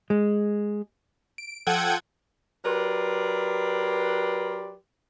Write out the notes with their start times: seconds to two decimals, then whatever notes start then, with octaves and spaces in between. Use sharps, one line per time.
0.10 G#3
1.38 D7
1.67 F3 A4 F#5 G5 G#6 D#7
2.65 F#3 G4 A#4 B4 D5 C6